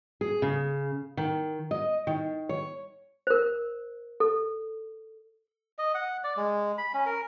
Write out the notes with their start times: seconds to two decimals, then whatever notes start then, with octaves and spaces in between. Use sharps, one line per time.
0.21 G#4
0.42 C#3
1.17 D#3
1.71 D#5
2.07 D#3
2.49 C#5
3.27 A#4 C5
4.20 A4
5.79 D#5
5.95 F#5
6.24 D5
6.37 G#3
6.78 B5
6.94 C#4
7.06 A#4